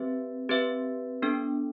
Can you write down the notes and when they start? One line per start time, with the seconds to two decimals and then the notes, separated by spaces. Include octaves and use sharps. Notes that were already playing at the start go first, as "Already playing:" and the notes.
Already playing: C4 G4 B4 E5
0.49 C4 G4 B4 E5
1.22 B3 D4 A4